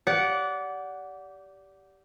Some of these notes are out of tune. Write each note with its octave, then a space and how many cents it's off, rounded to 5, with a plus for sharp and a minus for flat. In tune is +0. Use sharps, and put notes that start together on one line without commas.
G4 -10 D5 -25 F#5 +0